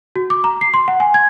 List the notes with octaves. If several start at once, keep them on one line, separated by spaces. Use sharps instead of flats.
F#4
D6
A#5
C7
C6
F#5
G#5
G#6